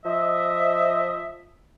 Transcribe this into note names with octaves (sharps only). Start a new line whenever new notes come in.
F3 D#5 E5